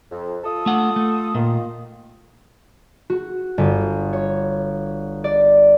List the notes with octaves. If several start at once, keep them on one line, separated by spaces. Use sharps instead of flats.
F2
F4 A4 D#6
A3 F#5
A3
A#2 D#3 F4
F#4
G1
C#5
D5